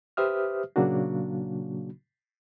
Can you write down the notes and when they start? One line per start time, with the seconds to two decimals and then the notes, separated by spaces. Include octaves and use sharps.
0.17 G4 B4 C5 E5 D#6 F6
0.76 A#2 C#3 F#3 A#3 D4 F#4